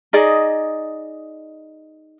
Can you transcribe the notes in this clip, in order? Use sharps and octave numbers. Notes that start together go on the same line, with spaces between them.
D#4 G#4 D5 D#5